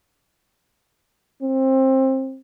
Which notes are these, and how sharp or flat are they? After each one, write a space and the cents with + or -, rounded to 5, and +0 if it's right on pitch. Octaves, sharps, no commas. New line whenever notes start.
C4 +20